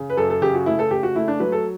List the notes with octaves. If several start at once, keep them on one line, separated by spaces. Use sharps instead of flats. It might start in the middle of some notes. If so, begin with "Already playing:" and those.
Already playing: C#3
B4
F#2 A4
A4
C#3 G4
F#4
A3 E4
A4
C#3 G4
F#4
A3 E4
D4
F#3 B4
A4